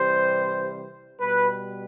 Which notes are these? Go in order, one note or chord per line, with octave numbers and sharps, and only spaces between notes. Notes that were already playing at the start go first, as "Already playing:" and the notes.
Already playing: C3 E3 G3 C5
B2 G3 B4